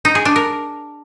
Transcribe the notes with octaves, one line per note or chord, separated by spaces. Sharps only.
D#4
G#4
D4
A#4